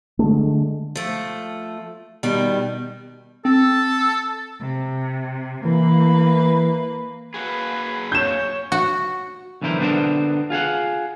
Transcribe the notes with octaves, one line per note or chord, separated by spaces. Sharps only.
D3 G#3 A3
F3 A3
B2 D#3 G3
C4 A4
C3
E3 A#3 B4
A#3 F#4 G#4 B4
C#5 G6 E7
F#4
B1 D3 E3 E4 A#4 C5
D3 B3 D4 E4 A#4 C5
F4 G#4 F5 F#5